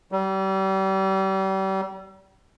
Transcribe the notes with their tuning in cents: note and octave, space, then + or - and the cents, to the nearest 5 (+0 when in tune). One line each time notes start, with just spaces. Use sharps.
G3 -35